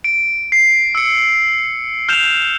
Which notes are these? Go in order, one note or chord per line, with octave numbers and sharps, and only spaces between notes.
D7
C7
E6 C#7
F6 G6 E7 F7